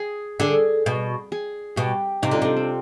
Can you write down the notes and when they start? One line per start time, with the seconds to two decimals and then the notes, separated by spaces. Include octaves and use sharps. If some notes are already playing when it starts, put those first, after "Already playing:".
Already playing: G#4
0.40 D3 G#4
0.86 B2
1.32 G#4
1.76 B2 G4
2.22 C3 D#4
2.31 D3 F4
2.42 C3 D4
2.57 C4